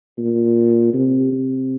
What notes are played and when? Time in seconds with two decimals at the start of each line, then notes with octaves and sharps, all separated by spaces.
0.18 A#2
0.94 C3
1.32 C3